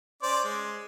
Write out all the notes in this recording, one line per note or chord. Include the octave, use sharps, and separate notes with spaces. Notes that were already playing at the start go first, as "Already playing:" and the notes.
C#4 C5 D5
G#3